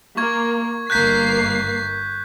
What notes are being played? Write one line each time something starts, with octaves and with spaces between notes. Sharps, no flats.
A#3 C#6 G#6
G1 A#3 F#6 G6 B6 C7